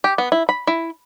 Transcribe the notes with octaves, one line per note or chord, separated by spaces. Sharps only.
G4
B3
E4
B5
E4